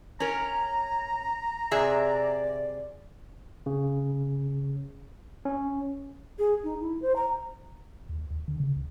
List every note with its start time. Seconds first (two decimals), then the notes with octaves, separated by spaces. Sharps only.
0.20 C#4 A#4 A#5
1.71 C3 G#4 D5 E5
3.66 C#3
5.45 C#4
6.39 G#4
6.64 D#4
6.81 E4
7.02 C5
7.16 A#5
8.09 D#2
8.30 D#2
8.48 D3
8.60 C#3
8.76 C#2